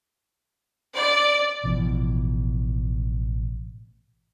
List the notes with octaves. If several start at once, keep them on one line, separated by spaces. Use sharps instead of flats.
D5
A1 B2 E3 F3